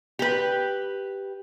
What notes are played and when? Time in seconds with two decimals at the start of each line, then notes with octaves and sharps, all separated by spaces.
0.19 G4 B4